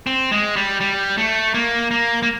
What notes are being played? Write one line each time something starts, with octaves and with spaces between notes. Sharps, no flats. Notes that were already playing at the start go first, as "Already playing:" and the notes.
C4
G#3
G3
G3
A3
A#3
A#3
A#3